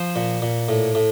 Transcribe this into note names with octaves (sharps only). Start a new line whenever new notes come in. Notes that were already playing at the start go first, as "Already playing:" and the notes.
Already playing: F3 C5
A#2
A#2
A2
A2